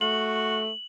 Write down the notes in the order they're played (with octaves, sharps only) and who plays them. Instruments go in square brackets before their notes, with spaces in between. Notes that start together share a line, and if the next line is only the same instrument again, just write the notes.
[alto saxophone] A3 [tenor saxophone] F#4 [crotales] F#7